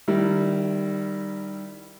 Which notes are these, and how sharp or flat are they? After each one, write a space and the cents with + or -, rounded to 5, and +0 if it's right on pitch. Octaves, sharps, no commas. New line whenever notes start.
D#3 -25 G3 +0 E4 +0